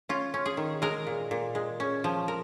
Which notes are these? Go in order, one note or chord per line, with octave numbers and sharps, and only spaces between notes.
C#4 F4
C#4
G#4
D#3
G#3 A#4
A#2
A#2
G#3
C#4
F3
A#4